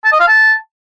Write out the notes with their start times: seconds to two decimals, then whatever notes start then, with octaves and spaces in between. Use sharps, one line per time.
0.05 A5
0.12 D#5
0.20 F5
0.28 A5